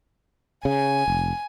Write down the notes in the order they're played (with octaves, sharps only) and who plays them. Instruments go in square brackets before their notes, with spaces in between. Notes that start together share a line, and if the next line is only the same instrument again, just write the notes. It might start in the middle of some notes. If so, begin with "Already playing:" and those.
[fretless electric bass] C#3 [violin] G#5
[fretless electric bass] F1